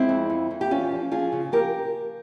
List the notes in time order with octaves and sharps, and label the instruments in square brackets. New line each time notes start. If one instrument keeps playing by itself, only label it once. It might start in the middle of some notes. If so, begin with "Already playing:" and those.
Already playing: [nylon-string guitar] G#3 C4 E4
F2
F2
F2
G4
E2 C#4 F4
F3
F3 F4 G#4
C#3
F3 G4 A#4